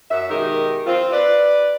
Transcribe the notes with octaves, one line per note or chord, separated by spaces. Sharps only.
F#2 E5
B2 D#3 G#3 D#4 G4 A#4
C4 F4
B4 D5